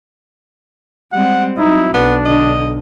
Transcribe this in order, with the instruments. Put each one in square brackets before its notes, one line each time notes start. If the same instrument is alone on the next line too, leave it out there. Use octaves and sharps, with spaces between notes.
[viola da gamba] G3 G#3 C4 [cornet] F#5
[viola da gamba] F#3 C4 [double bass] D#4 [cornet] E4
[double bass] B1 [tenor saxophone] B3 [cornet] D4
[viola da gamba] D3 [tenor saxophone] D#5